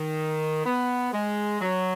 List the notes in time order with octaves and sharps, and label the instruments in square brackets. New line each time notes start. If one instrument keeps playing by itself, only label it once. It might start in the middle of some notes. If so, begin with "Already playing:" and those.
Already playing: [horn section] D#3
B3
G#3
F#3